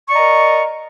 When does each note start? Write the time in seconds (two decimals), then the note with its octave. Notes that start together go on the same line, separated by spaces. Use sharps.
0.07 C#6
0.10 D5
0.12 D#5
0.15 A#5
0.18 A#4